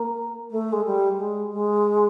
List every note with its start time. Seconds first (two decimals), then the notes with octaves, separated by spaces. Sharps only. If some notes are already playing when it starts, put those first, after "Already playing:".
Already playing: A#3
0.51 A3
0.72 G#3
0.85 G3
1.18 G#3
1.52 G#3